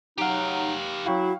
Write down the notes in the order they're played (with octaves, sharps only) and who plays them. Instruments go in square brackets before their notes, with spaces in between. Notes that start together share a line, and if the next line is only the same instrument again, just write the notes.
[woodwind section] F#3 D#4 [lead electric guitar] G4 F5 [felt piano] F#5 D7
[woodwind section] F#3 E4 [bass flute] F#4 [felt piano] F5 G5 C#6